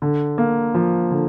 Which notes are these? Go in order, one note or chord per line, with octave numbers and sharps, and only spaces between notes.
D3
A#3
F3
D3